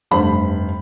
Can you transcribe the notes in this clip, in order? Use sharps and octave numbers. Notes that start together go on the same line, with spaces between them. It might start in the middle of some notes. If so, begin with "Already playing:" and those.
F1 G2 C5 B5